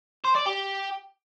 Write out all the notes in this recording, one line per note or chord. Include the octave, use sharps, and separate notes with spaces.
C5
D5
G4